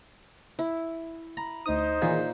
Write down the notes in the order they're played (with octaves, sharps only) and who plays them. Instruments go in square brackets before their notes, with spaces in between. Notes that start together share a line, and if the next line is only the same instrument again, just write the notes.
[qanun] E4
[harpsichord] A#5 [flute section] B5
[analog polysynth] D2 D#6 [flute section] D#4 C5
[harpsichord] A#2 [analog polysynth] D#3 E3 G#4